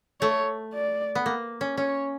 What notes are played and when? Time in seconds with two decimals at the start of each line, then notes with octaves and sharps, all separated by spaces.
0.21 A3 C#5
0.73 D5
1.15 B3
1.26 A#3
1.61 C#4
1.77 C#4 C#5